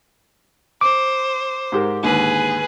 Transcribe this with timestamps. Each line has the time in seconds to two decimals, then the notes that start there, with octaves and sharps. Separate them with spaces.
0.81 C5 D6
1.72 G#2 G4 A#4
2.03 D#2 G#2 D3 G#4 B4